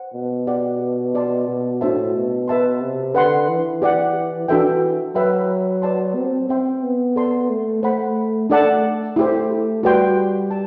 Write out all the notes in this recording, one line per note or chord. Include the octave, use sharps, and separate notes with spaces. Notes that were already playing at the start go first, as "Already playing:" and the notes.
Already playing: C5 F#5
B2
G4 D5 F#5
G4 D5 A5 C6
B2
A2 D4 F#4 C5 E5 A5
B2
B4 E5 A5 C6
C3
D3 B4 F#5 C6
E3
G4 D5 F#5
E3 D4 F#4 A4 E5 G5
F#3 B4 E5 G5 B5
B4 D5 A5 C6
C4
C4 C5 E5 G5 C6
B3
A4 D5 A5 C6
A3
A3 C5 F#5 B5
A3 D4 A4 D5 F#5 A5
A3 E4 G4 C5
G3 F#4 B4 D5 G5 C6
A5